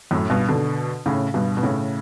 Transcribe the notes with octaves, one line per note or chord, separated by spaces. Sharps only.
F#2 A2
G2 B2
B2 D3
A2 C#3
G2 B2
B2
A2 C#3